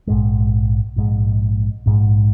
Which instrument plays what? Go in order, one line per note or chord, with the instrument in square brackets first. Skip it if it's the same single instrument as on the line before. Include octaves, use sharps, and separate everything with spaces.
[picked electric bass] A#1 G#2 G#3
A#1 G#2 G#3
A#1 G#2 G#3